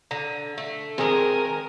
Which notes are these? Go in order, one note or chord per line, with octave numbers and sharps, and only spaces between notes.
D3 A#5
A3
D#3 G#3 C4 G#4 A#4 G#5